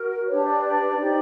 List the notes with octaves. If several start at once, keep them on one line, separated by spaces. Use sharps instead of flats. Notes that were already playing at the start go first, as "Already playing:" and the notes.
Already playing: F#4 A#4
D4 G4 B4 C#5
D5
D5
D#4 G4 C5